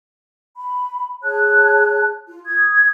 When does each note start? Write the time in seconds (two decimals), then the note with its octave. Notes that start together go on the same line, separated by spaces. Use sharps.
0.57 B5
1.23 G#4 C#5 A5 F#6
2.27 F4
2.46 D#6 G#6